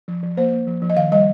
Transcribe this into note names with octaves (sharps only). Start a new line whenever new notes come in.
F3
F3
A#3 C5
A#3
F3
F3
D#5
D#3 F5
G3 D#5